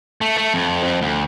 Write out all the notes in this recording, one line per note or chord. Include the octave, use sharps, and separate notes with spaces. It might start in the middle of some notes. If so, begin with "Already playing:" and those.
A3
A3
F2
F2
D2